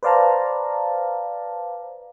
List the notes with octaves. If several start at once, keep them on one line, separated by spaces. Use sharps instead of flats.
B4 C5 D5 F5 A5 A#5